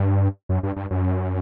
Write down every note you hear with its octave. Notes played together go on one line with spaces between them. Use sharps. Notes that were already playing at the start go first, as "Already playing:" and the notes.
Already playing: G2
F#2
G2
G2
F#2